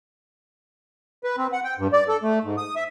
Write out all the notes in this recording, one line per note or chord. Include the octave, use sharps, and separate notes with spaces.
B4
C4
F#5
G5
G2
D5
A4
A3
G#2
D#6
E5